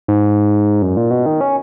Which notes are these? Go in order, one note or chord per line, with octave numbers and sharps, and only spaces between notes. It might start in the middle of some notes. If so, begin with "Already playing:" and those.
G#2
F#2
A#2
B2
D#3
C#4